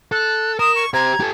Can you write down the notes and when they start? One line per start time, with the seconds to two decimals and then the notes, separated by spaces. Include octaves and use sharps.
0.12 A4 F#6
0.59 A#4 D#6 E7
0.75 C#6
0.94 G4 C5 A#5 G#6
1.20 G4 A4